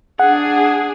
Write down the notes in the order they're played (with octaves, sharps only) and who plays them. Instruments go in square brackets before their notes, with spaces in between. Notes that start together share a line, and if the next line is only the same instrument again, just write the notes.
[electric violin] D4 G#4 [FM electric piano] F#5